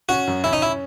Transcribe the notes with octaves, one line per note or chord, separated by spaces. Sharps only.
C#4 F#4
F#2
C#4 E4
D#4
E4